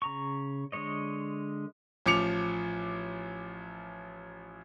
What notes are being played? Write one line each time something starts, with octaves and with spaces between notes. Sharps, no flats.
C#3 A#5 C#6
D3 G#3 C#5 D#5
A1 F3 D6 C#7 F7